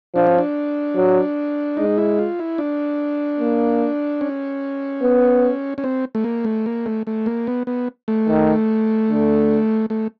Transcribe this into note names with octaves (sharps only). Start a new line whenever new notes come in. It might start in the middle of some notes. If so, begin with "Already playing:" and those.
F3 D4
C#4
D4
F#3
G#3 D#4
E4
F4
E4
D4
A#3
C#4
B3
C#4
C4
A3
A#3
A3
A#3
A3
A3
A#3
B3
B3
A3
D#3
D3
A3